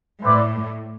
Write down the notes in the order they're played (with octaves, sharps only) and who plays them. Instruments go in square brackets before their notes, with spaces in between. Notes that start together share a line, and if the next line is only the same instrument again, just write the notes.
[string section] A2 [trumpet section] C4 E4 B4 D5